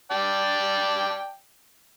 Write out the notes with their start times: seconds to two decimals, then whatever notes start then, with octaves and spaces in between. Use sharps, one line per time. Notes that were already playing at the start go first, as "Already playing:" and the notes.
0.11 D5 G5 A5